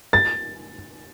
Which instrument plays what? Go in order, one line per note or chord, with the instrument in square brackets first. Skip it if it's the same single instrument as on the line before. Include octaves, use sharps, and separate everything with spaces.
[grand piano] A6